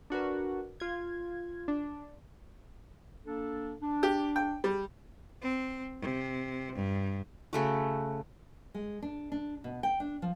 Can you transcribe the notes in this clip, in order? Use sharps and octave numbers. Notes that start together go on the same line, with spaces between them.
D4 F#4 A#4 B4
F4 G#6
D4
A#3 D4 A4
D4
G4
G5
G3
C4
C3
G2
C#3 A3 F#4
G#3
D4
D4
B2
G5
D4
F3